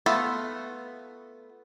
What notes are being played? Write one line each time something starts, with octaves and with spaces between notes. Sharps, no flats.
A3 B3 F4 A4